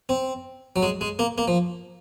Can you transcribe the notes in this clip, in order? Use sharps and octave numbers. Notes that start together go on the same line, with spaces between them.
C4
F#3
G#3
G#3
A#3
A#3
F3